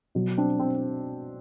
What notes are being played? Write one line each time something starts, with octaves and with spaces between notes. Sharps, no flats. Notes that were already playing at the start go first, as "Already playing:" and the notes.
B2 F#3
C4 D4
C4